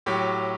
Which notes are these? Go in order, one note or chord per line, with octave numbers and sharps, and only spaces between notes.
A2 F#3 G4